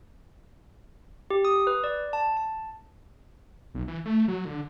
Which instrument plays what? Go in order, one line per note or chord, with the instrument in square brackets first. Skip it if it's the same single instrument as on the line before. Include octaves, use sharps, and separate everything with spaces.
[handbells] G4
D#6
B4
D5
A5
A5
[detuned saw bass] B1
E3
A3
F#3
D3